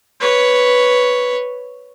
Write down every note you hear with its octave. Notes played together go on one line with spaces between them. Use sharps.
B4 C#5